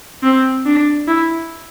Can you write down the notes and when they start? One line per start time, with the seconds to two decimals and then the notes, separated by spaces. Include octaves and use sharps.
0.23 C4
0.66 D4
1.07 E4